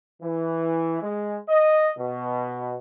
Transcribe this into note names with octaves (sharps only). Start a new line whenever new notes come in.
E3
G#3
D#5
B2